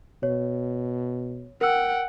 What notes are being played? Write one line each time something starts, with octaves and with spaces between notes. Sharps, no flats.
B2 C#5
A#4 F#5 G5 E6